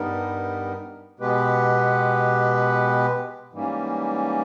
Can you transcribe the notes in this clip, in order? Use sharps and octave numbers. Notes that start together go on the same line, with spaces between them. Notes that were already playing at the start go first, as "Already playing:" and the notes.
Already playing: G2 G3 B3 D#4 A#4
B2 G#3 B3 G4 B4
G#2 E3 G3 A#3 C#4